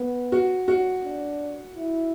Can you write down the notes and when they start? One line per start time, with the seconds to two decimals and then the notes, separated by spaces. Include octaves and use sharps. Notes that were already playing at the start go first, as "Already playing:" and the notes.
Already playing: B3
0.32 F#4
0.68 F#4
1.05 D4
1.77 E4